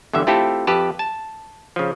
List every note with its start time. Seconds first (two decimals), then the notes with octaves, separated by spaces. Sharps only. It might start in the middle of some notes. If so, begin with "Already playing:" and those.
0.13 E2 G2 D3 E5
0.27 A3 C4 E4 F4 G4 A4
0.67 F2 G4 B4 A5
0.99 A5
1.76 C#3 F3